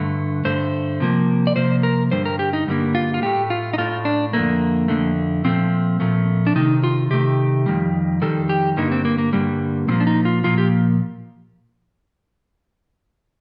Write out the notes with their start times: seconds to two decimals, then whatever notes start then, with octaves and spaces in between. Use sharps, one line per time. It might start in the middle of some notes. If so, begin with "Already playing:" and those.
Already playing: G2 D3 A3
0.45 G2 D3 A3 C5
1.00 C3 F3 A#3
1.47 D5
1.56 C3 F3 A#3 C5
1.83 A#4
2.11 G2 D3 G3 C5
2.25 A#4
2.39 G4
2.53 D#4
2.67 G2 D3 G3 A#3
2.95 F4
3.14 F4
3.22 A2 A3 G4
3.50 F4
3.74 D#4
3.78 A2 A3 F4
4.05 D4
4.33 F2 D3 A3 A#3
4.88 F2 D3 A3
5.44 A#2 F3 A3 C4
6.00 A#2 F3 A3
6.47 D4
6.55 C3 D#3 A3 D#4
6.84 F4
7.10 C3 D#3 A3 G4
7.66 F2 C3 D#3 G3
8.22 F2 C3 D#3 G3 A4
8.49 G4
8.77 G2 D3 G3 A#3 D#4
8.92 C4
9.05 A#3
9.18 A#3
9.33 G2 D3 G3 A#3
9.88 A#2 F3 A#3 C4
10.00 D4
10.07 D#4
10.25 F4
10.44 A#2 F3 A#3 F4
10.58 G4